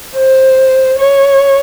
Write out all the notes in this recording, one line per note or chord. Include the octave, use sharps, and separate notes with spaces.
C5
C#5